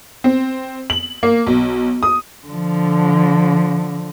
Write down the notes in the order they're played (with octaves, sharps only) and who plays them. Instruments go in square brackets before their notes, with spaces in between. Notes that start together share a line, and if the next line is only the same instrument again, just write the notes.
[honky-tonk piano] C4
F#7
A#3
B1
D#6
[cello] D3 F3